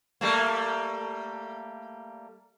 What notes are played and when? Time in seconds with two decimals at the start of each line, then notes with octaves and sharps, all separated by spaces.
0.21 G3 A3 A#3